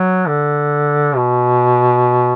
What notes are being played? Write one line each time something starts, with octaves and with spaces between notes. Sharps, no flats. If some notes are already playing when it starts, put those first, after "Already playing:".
Already playing: F#3
D3
B2